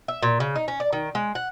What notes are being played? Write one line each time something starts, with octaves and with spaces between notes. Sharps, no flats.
E5
A#2
C#3
D#4
C#4
D5
D#3
G#3
F#5